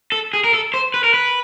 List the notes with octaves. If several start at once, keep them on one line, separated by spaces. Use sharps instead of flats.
A4
G#4
A#4
A4
C5
B4
A#4
B4